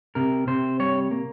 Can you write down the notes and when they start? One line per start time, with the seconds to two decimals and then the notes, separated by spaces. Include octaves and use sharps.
0.15 C3 A#4
0.47 C3 C5
0.80 G3 C#5
1.11 A#3